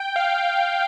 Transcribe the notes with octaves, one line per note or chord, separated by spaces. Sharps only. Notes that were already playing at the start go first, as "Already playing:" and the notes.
Already playing: G5
F5